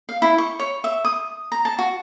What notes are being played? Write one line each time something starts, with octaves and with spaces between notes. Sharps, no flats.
F5
E4
C#6
C#5
E5
D#6
A#5
A5
F#4